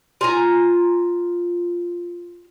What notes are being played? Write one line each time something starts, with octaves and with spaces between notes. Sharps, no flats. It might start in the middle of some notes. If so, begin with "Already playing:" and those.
F4 G#5 A#5